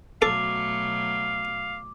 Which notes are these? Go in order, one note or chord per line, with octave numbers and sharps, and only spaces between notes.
B2 F#3 A3 A4 F5 D6